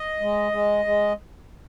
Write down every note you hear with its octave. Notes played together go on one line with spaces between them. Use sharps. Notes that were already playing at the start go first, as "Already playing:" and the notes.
Already playing: D#5
G#3
G#3
G#3